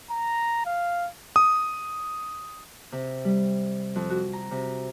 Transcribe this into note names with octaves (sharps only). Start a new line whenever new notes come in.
A#5
F5
D#6
C3
G3
F2
F#4
A#5
C3